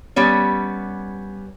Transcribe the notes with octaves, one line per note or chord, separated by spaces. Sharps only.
G3 B3 C#4